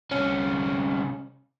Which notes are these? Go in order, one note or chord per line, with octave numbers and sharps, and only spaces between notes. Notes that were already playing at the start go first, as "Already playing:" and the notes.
C2 C#4